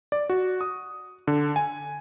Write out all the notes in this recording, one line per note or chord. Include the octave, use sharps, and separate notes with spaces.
D5
F#4
D#6
D3
G#5